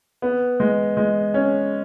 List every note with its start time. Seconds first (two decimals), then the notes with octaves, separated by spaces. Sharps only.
0.22 B3
0.60 G#3
0.97 G#3
1.34 C#4